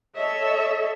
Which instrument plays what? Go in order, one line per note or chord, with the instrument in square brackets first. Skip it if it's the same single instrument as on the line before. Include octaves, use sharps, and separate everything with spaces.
[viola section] A4 C#5 D#5 E5